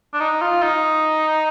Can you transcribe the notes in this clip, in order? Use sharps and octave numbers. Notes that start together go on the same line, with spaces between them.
D4
D#4
F4
D#4